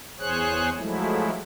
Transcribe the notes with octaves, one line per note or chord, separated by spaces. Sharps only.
E2 G#4 C5 C#5 F#6
F3 F#3 G#3 A3 E4